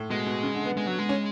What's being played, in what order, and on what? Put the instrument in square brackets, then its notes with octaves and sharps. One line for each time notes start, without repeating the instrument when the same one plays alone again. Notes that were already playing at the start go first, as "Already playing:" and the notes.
Already playing: [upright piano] A2
[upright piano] B2 [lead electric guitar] G#3
[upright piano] B2
C#3
D3
B3
[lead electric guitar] G#3
F#3
G#3
[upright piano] C#4